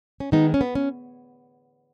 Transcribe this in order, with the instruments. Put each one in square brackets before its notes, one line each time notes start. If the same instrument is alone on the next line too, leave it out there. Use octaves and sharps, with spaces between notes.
[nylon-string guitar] C#4
D#3 G#3 B3 D#4
C#4
B3
C#4